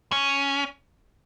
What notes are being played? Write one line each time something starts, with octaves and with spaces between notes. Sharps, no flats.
C#4